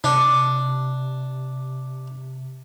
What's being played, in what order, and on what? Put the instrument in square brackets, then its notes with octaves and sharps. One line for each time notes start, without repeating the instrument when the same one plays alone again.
[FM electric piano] C3 [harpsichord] D4